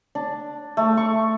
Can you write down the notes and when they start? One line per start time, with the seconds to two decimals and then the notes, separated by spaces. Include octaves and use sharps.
0.15 D4
0.77 A3
0.97 C#6